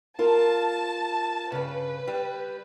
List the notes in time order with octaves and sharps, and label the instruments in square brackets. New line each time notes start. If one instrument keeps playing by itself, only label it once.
[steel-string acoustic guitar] F4 A#4 [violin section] A5
[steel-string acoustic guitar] G2 C#3 [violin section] B4
[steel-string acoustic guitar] G3